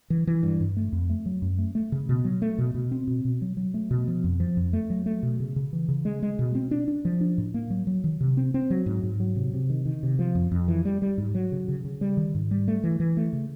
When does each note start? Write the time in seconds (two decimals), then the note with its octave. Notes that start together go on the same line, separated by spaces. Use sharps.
0.10 E3
0.27 E3
0.43 G2
0.60 G2
0.77 A3
0.93 F2
1.10 A3
1.26 F#3
1.42 F#2
1.58 A3
1.75 A3
1.92 C#3
2.09 B2
2.25 F#3
2.42 A3
2.58 B2
2.75 B2
2.91 C4
3.07 B2
3.25 B2
3.42 F#3
3.57 F#3
3.74 A3
3.91 B2
4.08 F3
4.24 F2
4.40 F3
4.57 F2
4.73 A3
4.90 F#3
5.06 A3
5.23 B2
5.40 C#3
5.56 C#3
5.73 E3
5.89 C#3
6.05 G#3
6.22 G#3
6.39 B2
6.55 C4
6.71 D4
6.88 D4
7.05 F3
7.21 D4
7.38 A2
7.54 A#3
7.70 F#3
7.87 F#3
8.04 D#3
8.21 C3
8.37 C4
8.54 C4
8.70 F#3
8.86 G#2
9.03 G#2
9.20 F#3
9.36 C3
9.53 C3
9.70 D#3
9.85 D#3
10.03 C3
10.19 F3
10.35 F2
10.51 F2
10.68 E3
10.85 G3
11.02 G3
11.18 G#2
11.35 F#3
11.52 C#3
11.68 C#3
11.85 C#3
12.01 G3
12.17 D#3
12.35 G#2
12.51 G3
12.68 A3
12.84 E3
13.00 E3
13.17 A3
13.33 C#3